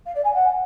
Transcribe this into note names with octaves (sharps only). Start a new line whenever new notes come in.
F5
D5
G#5
F#5